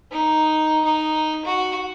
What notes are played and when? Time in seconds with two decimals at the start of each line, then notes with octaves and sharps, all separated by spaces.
0.12 D#4
0.85 D#4
1.46 F#4